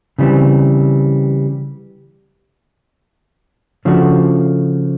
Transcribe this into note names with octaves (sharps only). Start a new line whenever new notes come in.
C#3 E3 G3 C4
C#3 F3 A3 D4 F#4